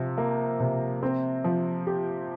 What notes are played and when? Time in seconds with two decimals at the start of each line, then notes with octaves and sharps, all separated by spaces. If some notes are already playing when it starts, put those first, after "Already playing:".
Already playing: C3 F3
0.18 A#3
0.60 C3
1.03 C4
1.44 F3
1.87 G4